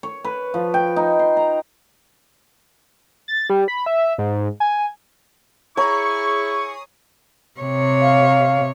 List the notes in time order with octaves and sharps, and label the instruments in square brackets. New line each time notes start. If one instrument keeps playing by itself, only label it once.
[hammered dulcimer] C#5
B4
F3
G5
D#4
C6
A#5
[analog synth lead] A6
G3
B5
E5
G#2
G#5
[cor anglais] E4 [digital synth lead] G#4 [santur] C#5 A#5 [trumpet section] C#6
[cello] C3 C#5
[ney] F5